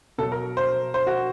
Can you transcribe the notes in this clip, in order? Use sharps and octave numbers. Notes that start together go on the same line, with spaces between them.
B2 F#3 A4
A#4
C5
C5
F#4